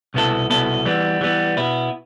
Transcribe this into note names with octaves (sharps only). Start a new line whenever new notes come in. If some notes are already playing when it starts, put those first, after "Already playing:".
C2 B2 B3 E4 A4
C2 B2 B3 E4 A4
E3 G3 B3
E3 G3 B3
B2 B3 E4